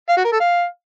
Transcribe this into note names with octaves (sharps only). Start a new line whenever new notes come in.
F5
F#4
A#4
A4
F5